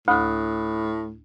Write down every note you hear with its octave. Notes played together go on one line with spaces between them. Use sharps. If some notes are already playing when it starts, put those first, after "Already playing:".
D2 A2 B5 D#6 F#6